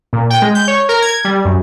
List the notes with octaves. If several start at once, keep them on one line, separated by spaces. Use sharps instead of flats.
A#2
G5
G#3
G6
C#5
A#4
G#6
G3
F#2